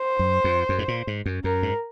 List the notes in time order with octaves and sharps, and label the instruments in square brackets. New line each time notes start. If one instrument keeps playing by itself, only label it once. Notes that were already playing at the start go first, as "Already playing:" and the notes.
Already playing: [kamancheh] C5
[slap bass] F#2
F2
F#2
G#2
A#2
G#2
F#2
[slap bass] F#2 [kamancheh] A#4
[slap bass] G#2